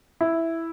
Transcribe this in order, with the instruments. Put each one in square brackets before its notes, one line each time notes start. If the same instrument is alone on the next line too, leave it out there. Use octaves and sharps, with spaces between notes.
[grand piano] E4